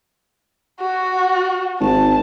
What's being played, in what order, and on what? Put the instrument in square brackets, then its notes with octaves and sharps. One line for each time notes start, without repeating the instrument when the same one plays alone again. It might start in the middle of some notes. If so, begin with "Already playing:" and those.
[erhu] F#4
[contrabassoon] G#1 [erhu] A5